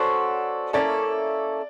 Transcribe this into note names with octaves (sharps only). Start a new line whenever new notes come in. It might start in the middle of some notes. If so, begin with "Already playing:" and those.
Already playing: C#4 F#4 A4 C5 D5
A#3 C#4 E4 A4 D5